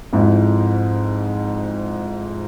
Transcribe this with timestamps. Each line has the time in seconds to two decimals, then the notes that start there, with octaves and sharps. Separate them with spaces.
0.13 F2 G#2 E4